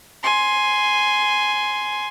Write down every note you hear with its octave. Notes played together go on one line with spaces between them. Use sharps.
G#5 C6